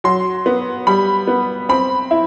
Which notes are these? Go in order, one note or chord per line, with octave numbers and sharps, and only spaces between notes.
F#3 C6
B3
G3 B5
B3
C4 B5
E4